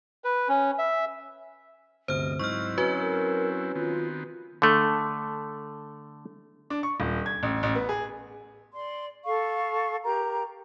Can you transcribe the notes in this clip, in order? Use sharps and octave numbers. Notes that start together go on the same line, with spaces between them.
B4
C#4
E5
G1 D2 C3 C5 D#5 F6
G#2 F#3 C4 E4 D#5 C#6 F6
C#4 F#4 B4
A#4
D#3 B3 C4 F4
D3 A3
D4
C#6
D#1
G#6
A1
A1
B3
G#4
D5 C6
A4 F5 C#6
G4 A#4 A#5